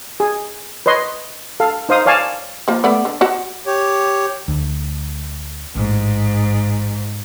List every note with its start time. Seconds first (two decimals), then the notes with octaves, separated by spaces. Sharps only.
0.20 G#4
0.86 B4 C#5 D#5 C6
1.60 A4 F5
1.89 D#4 C5 F5 D#6
2.06 C#5 D5 F5 G#5 A5
2.68 F3 A#3
2.84 A3 B3 D5
3.05 D3
3.21 F#4 F#5
3.66 G4 C#5
4.48 D2
5.75 A1 G#2